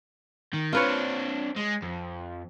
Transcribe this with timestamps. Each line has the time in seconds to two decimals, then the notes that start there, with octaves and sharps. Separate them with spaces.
0.53 D#3
0.73 C4 D4 F4 B4 C#5
1.56 G#3
1.83 F2